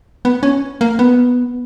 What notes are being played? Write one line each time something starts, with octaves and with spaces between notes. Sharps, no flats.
B3
C#4
A#3
B3